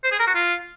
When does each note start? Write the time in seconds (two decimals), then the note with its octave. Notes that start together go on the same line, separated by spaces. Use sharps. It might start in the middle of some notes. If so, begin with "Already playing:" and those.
0.04 C5
0.12 G#4
0.20 A#4
0.27 F#4
0.35 F4